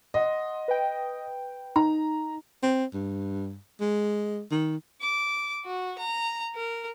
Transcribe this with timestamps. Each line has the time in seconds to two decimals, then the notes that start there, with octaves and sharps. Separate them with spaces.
0.14 D#5 F#5 C6
0.68 B4 G5
1.76 D#4 A#5
2.63 C4
2.94 G2
3.81 G#3
4.51 D#3
5.01 D6
5.65 F#4
5.98 A#5
6.55 A#4